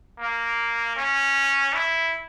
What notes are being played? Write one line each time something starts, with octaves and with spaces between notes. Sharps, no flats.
A#3
C#4
E4